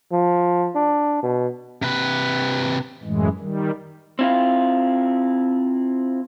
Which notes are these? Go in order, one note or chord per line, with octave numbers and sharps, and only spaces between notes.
F3
D4
B2
C3 B4
F#2 A2 E3 G#3
D#3 G3
C4 E4 F4